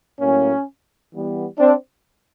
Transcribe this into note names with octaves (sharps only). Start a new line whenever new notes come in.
A2 F#3 A#3 C#4
E3 G3 B3
C4 D4